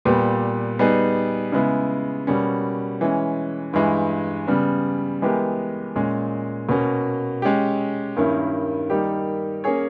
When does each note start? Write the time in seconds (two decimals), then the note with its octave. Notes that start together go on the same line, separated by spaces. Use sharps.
0.05 A#2 G3 B3 G4 B4
0.79 G3 B3 D#4 G#4 B4
1.52 C#3 G#3 B3 E4
2.27 B2 G3 A#3 C#4
3.01 E3 G#3 C#4
3.73 G2 E3 G#3
4.47 C#3 G3 B3
5.22 E3 G#3 B3 G4 A#4
5.96 A#2 G#3 C#4
6.69 B2 A#3 C#4
7.42 G#3 C#4 G4
8.16 G2 D#3 A#3 C#4 E4
8.90 D#3 G3 A#3 D#4 G4
9.64 A#3 C#4 G#4 C#5